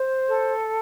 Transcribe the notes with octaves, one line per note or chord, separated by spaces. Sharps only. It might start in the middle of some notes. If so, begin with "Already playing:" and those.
Already playing: C5
A4